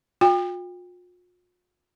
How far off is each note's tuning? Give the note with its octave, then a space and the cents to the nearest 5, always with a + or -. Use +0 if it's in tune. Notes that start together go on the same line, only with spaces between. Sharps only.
F4 +40 G5 +30